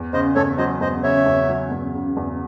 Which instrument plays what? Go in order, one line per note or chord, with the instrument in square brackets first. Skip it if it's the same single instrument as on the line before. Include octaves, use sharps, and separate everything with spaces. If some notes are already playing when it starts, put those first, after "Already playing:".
Already playing: [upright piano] E2
[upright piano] C#3 [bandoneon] C5 D#5
[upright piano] E2 [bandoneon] A4 C#5
[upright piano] F#3 [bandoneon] C5 D#5
[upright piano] E2 [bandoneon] C5 D#5
[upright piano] C#3 [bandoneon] C#5 E5
[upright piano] E2
F#3
E2
C#3
E2